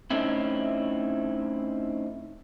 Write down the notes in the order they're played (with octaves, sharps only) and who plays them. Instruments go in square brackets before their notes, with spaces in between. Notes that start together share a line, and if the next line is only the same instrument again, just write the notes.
[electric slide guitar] A3 C4 C#4 D#4 E4